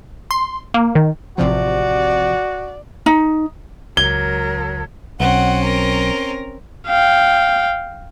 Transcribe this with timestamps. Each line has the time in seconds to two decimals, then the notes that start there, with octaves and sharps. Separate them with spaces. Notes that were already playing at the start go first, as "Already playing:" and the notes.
0.31 C6
0.74 A#3
0.95 D#3
1.38 A1 C3 F3 F#4 D5
3.06 D#4
3.97 C#2 F#3 A#4 G#6 G7
5.20 B1 C4 C#4 F#5
5.64 A#4
6.87 F5 G5